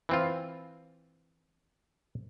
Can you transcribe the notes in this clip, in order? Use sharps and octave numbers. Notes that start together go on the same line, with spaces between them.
E3 C4 F4